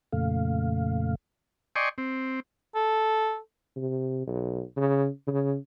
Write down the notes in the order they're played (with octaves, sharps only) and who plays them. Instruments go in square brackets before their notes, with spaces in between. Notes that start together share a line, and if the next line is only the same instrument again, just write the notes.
[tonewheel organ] F2 A#2 C#3 A3 F5
[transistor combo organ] D5 D#5 G5 G#5 C6 C#6
C4
[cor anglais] A4
[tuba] C3
B1
C#3
C#3